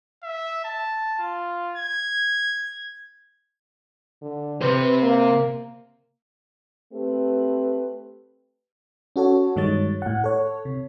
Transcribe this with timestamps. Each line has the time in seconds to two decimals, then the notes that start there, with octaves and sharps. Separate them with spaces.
0.23 E5
0.64 A5
1.19 F4
1.76 G#6
4.22 D3
4.61 C3 B4 C5
5.03 A#3
6.93 A3 C4 G4 B4
9.16 C#4 F#4 A4 C#5
9.56 G2 D#3 G3 G#3 C#5 A6
10.02 A2 F#5
10.24 A4 C#5
10.65 C3